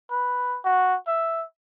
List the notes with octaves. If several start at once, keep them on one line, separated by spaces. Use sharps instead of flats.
B4
F#4
E5